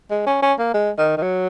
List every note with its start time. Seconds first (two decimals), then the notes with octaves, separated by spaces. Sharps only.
0.10 G#3
0.26 C#4
0.42 C#4
0.59 A#3
0.74 G#3
0.98 D#3
1.17 D#3
1.23 F#3